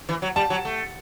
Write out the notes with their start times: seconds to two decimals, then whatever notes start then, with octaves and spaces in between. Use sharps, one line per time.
0.09 E3
0.22 F#3
0.36 G3 A5
0.50 F#3
0.65 A3